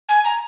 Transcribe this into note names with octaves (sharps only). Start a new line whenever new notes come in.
G#5
A#5